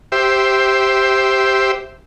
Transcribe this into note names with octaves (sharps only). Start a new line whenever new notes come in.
G4 C5 E5